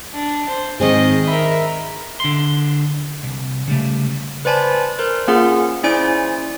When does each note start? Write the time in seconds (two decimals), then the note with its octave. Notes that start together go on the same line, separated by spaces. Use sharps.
0.13 D4
0.49 C5
0.80 G#2 D#3 C4 G#4 D#5
1.28 A#4 E5 B5
2.20 D3 C6
3.23 C2
3.68 C#3 G3 A3
4.45 B4 C5 D5 G#5 A5 B5
4.99 A#4 C5
5.28 A#3 C#4 F4 G#4 A#4 F#5
5.84 C#4 E4 C5 D5 G#5 D7